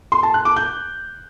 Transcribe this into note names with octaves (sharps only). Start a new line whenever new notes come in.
C6
A5
F#6
D6
G6